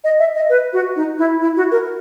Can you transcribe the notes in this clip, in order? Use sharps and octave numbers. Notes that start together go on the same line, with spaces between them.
D#5
E5
D#5
B4
F#4
D#4
E4
E4
F#4
A#4